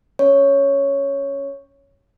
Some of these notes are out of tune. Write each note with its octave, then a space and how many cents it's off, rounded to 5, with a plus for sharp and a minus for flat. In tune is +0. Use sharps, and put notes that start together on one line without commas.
C#4 +0 C#5 +0